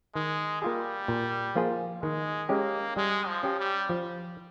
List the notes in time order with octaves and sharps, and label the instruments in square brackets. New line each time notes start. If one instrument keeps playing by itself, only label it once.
[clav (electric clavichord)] D#3 [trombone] G#3
[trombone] G3 [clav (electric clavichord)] A#3 F4 G#4
[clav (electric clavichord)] A#2
F3 A#3 F4 G#4
[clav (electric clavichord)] D#3 [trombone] G#3
[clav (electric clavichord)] G#3 C#4 G4 [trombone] A#3
[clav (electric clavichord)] G3 [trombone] G#3
[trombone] F3
[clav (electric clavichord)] C#4 G4
[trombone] G3
[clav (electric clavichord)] F3